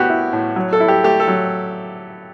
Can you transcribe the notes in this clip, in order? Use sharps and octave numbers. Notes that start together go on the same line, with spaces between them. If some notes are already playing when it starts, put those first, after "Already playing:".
Already playing: A2 B3 F#4 G4
E4
A2
F#3
A4
E4
G4
A3 G4
A4
F#3